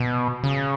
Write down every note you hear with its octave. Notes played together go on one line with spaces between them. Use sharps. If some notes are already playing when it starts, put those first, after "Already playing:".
Already playing: B2
C#3